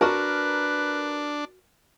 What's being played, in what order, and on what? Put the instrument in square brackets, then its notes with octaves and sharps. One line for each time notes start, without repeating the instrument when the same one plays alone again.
[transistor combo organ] D4 [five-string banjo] F#4 A5 [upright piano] A#4 [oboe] B4